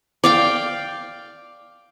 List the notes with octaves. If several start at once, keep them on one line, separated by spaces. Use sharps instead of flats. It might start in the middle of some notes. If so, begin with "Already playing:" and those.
D5 F5 G5